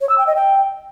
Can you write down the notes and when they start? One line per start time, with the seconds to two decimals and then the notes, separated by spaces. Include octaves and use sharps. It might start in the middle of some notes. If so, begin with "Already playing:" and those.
0.01 C#5
0.09 E6
0.18 G5
0.27 D#5
0.36 G5